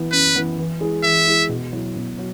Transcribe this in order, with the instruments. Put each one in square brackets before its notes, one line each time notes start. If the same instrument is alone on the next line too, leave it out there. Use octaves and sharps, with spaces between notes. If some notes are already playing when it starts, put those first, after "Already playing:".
Already playing: [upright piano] E3 B3 E4
[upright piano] F#2 [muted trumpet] B4
[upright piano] E3 B3 E4
E3
G#3 E4 G#4
[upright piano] E3 [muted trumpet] E5
[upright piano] G#3 E4 G#4
B2
F#3 E4
B2
F#3